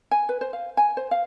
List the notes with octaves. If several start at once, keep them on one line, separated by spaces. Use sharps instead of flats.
G#5
B4
C5
F5
G#5
C5
F5